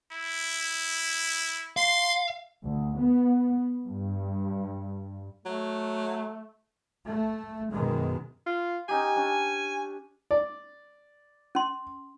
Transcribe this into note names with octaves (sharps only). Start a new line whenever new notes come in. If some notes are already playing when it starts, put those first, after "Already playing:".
E4
F5 C6
D2
B3
G2
F#3 A3
A3
F#2 B2 D#3 G#3
F4
C#4 D#4 G4 G#5
C#4 D4
D5
C#4 C6